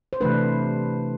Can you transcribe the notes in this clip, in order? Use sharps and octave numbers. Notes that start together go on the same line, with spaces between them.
C5
C3 E3 A3 D4 B4